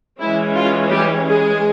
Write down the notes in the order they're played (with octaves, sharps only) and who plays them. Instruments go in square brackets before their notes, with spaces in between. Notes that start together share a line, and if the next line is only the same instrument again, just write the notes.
[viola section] E3 G#3 C#4 E4
F4
G3 G4
G#3 G#4